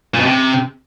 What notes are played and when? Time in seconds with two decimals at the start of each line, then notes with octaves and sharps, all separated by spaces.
0.14 A#2
0.20 B2
0.26 C3